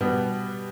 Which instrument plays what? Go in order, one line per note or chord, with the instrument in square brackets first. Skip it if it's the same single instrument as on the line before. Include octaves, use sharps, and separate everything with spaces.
[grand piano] B2 G3 B3 B4